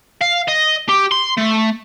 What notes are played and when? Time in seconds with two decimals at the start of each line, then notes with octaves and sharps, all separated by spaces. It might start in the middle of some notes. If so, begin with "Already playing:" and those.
0.21 F5
0.48 D#5
0.89 G4
1.12 C6
1.37 A3